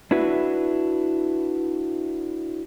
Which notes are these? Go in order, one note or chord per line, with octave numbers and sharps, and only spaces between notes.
D4 E4 F#4 B4 E5